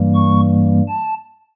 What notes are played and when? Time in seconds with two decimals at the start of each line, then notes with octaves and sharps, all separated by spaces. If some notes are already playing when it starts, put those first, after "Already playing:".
Already playing: G2 E3 G3 A#3
0.14 C#6
0.88 A5